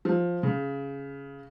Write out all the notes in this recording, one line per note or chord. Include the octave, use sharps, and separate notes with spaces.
F3
C#3